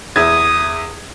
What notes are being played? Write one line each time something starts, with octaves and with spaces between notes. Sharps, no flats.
E2 E4 D#6 G#6